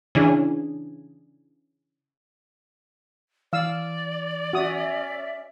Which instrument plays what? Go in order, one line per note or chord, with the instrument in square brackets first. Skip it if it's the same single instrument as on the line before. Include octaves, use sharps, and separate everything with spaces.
[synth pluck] C#3 E3 D4 G#4
[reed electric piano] E3 [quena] D5 [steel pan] F5 E6
[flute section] C#4 E5 [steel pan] F#4 D#6